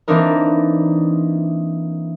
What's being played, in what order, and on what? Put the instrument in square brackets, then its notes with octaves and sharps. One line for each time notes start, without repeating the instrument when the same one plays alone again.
[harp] E3 A#3 C4 D4 D#4 A#4